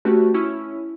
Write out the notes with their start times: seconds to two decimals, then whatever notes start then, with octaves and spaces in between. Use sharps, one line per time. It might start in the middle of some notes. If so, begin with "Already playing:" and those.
0.05 A3 C#4 F#4 G4 B4 A5
0.34 C#4 E4